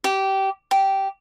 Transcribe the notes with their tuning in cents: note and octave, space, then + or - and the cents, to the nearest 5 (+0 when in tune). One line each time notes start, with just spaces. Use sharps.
G4 -20
G4 -10